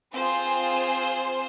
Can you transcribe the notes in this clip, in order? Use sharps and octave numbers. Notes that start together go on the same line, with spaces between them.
C4 F4 G#4 C5